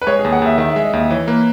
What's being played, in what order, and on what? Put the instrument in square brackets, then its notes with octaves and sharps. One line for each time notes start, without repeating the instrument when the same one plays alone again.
[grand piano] B4
[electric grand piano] G#3 [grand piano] C#5
[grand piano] G#4
[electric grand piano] D#2
[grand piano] F#5
[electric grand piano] D#2 [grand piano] E5
[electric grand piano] D#3 [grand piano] E5
[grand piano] E5
[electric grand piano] G#3
[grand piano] D#5
[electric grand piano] D#2 [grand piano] E5
[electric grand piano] E3 [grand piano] C#5
[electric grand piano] A#3 [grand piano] B4